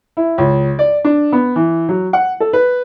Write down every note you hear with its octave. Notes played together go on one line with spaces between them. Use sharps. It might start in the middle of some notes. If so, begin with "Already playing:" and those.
E4
C#2
D5
D4
B3
E3
F#3
F#5
A4
B4